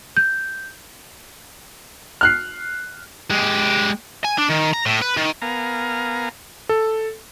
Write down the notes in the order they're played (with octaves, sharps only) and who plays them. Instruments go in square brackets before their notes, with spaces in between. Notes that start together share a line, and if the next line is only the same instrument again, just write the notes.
[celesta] G6
[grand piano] F6 F#6 C7
[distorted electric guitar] G#3 G4
G#5
D4
D#3
A#5
A2
B4
D#3
[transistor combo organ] B3 A#4 F5 G#5 A#5
[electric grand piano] A4